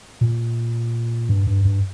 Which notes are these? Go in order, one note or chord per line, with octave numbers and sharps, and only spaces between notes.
A#2
G2
G2
G2